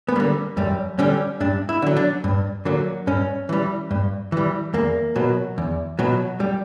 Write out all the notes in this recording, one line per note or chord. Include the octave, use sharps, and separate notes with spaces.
B3
D3 G3 A#3
F#2 G3
D3 G3 C#4
G2 D4
E4
D3 F#3
D4
G2
D3 F#3 A#3
G2 C#4
E3 G3
G2
E3 G3
E2 A#3
B2 F#3
E2
B2 F#3
G3